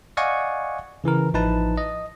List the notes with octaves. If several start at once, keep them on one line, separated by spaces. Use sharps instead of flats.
D5 D#5 F5 F#5 G#5 C#6
C#3 E3 E4 A#4
A1 F3 D#4 E4 B4 A5
D#5